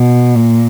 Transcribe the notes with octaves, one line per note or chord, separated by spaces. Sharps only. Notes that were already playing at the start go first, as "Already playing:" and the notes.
Already playing: B2
A#2